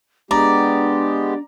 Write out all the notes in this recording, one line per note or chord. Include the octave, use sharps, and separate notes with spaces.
G#3 B3 D4 G4 D5 A#5